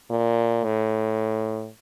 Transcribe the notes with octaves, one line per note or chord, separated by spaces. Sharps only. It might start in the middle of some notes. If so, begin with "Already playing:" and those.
A#2
A2